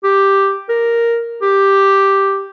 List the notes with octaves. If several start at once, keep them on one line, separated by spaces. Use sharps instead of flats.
G4
A#4
G4